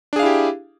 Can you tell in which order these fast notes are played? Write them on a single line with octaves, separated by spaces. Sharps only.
D4 G#4 F5 E4 G4